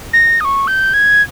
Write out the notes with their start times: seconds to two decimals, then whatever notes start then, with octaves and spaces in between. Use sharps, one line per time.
0.13 A#6
0.41 D#6
0.45 C#6
0.67 G6
0.94 G#6